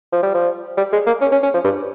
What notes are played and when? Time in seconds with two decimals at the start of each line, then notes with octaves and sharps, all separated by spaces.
0.12 F3
0.23 G3
0.34 F3
0.77 G3
0.93 G#3
1.06 A#3
1.21 C#4
1.32 C#4
1.43 C#4
1.54 F3
1.64 G2